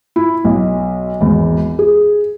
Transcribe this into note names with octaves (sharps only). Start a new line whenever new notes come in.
E4
B1
G#1 E2
G#4